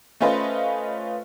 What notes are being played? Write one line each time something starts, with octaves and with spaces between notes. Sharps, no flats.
A3 C#4 F4 B4 C5 D#5